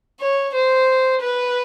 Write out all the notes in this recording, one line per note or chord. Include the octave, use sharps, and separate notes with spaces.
C#5
C5
B4